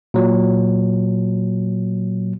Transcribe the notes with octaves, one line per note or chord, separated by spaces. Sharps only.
A#2 F#3